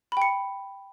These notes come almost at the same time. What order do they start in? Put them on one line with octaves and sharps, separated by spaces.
B5 G5 C#7